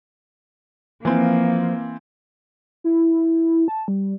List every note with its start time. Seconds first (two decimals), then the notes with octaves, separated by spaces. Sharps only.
1.05 E3 F3 A#3 C4
2.84 E4
3.68 A5
3.88 G3